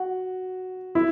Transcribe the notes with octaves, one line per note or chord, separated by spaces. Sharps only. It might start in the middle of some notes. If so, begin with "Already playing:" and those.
Already playing: F#4
E4